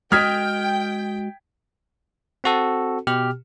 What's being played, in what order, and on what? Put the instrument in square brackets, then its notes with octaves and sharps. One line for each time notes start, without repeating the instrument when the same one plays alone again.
[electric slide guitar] G#3 F#4 D#5 [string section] G5 [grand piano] D#6 G#6 B6 [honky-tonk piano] F6
[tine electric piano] C4 F#4 A4
B2 G4 F6